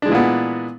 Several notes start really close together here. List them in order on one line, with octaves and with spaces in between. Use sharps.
D4 G#3 E3 A#2 B3